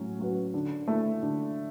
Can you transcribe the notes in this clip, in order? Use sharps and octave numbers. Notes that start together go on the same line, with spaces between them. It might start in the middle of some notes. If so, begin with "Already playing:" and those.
Already playing: A2 F#3 C#4
F#3 C#4 F#4 B4
D3
A3 E4 A4
D3